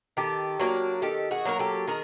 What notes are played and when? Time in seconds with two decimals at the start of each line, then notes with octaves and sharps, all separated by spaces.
0.17 D#3 G4 A4
0.60 F#3 A#3 D4
1.02 D#3 G4 A4
1.31 F#4 G#4
1.45 F#3 A#3 D4 A#4
1.59 G4 A4
1.87 D#3 G#4 A#4